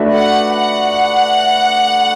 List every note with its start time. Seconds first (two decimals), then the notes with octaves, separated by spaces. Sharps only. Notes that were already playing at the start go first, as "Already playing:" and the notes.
Already playing: A3 D4 F#4 B4 E5
0.13 F#5
0.55 F#5